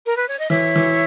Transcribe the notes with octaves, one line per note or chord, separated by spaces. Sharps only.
A#4
B4
C#5
D#5
E3 C#5 E5
E3